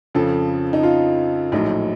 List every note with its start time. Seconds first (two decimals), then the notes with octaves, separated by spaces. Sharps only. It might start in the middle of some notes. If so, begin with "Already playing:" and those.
0.15 F2 C#3 F3 A4
0.73 D#4
0.83 F4
1.52 A#1 A2 F#3 D#4